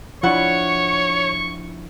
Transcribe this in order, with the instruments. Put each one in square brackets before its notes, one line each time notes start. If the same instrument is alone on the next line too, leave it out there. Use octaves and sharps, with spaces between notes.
[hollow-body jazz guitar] F3 D4 [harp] E4 F#5 [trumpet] C#5 [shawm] C#6